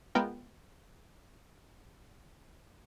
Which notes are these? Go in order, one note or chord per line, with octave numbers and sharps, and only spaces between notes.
G#3 B3 F4 A#4 G5